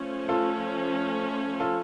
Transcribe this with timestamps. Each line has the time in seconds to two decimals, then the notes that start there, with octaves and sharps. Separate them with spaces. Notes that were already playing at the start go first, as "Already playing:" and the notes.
Already playing: F3 A3 C#4
0.29 F4 A4
1.60 F4 A4